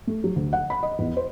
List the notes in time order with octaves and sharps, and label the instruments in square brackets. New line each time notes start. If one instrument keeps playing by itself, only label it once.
[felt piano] A3
F#3
D2
F#5
B5
D#5
E2
C5